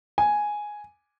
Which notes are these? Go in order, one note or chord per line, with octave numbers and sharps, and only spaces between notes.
G#5